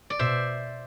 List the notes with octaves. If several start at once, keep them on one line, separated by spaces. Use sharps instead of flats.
D5
B2 C5 E5